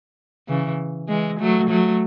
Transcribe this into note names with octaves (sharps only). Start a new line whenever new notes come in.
C#3 E3
E3 G#3
F#3 A3
F#3 A3